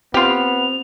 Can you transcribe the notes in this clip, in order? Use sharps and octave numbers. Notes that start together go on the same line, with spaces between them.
B3 C4 F4 G4 F7